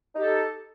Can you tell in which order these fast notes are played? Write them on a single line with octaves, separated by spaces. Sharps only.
D#4 G4 A4